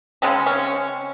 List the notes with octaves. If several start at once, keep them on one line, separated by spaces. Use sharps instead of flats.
C#3 G#3 C4 C#4
C#4